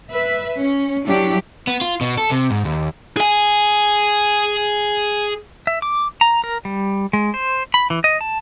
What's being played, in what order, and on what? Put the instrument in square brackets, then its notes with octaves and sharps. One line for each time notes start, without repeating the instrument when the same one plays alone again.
[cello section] B4 E5
C#4
F#3 D4 E4 G4
[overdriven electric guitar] B3
F4
B2
A4
C3
G#2
D#2
[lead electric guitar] G#4 G#5
[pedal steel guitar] E5
D6
A#5
A#4
G3
G#3
C5
B5
E3
D#5
A5